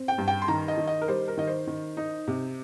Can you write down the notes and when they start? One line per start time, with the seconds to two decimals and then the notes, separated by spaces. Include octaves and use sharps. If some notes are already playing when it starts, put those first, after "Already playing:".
Already playing: C4
0.08 G5
0.18 G2
0.28 G5
0.42 C6
0.48 D#3 A#5
0.68 D#5
0.77 D#3
0.87 D#5
1.02 A#4
1.08 G3 C5
1.28 A#4
1.37 D#3 D#5
1.47 C5
1.67 D#3
1.97 D#4
2.28 C3